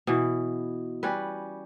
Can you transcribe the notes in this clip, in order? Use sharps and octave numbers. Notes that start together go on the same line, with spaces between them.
B2 E3
G3 C#4 B4